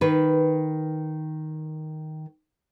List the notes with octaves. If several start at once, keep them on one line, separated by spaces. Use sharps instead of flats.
D#3 B4